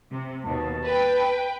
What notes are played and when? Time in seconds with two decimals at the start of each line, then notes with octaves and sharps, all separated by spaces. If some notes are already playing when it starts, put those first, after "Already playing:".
0.11 C3
0.44 D#2 B2 A5
0.84 B4 G5